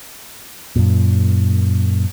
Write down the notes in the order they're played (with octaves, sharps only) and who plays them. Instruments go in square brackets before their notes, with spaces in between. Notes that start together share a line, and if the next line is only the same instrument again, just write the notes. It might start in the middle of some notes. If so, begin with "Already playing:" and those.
[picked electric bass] F#2 A#2